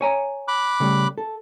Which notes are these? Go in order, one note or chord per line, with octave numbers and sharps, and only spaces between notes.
C#5 G#5 A#5
B5 D6 F#6
C#3 G3 A3
A4